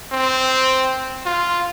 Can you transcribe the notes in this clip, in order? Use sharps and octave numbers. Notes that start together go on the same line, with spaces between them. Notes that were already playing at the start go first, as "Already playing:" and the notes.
C4
F4